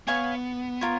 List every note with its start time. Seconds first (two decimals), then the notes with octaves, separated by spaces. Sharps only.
0.07 B3 C#5 F5 G#5 C#6
0.81 F4 A#4 C#5